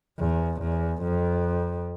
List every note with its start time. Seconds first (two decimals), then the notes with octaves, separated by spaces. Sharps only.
0.19 E2
0.61 E2
1.03 F2